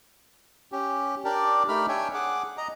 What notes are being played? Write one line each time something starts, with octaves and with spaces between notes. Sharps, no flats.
C#4 G4
D4 G4 A#4 D5
A3 D#4 G4 A#4 B5 F6
D4 C#5 E5 G5 G#5
G#4 F#5 D6
D#5 A#5